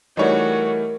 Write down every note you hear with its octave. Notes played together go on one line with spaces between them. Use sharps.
E3 G3 A3 D#4 F#4 A#4 C#5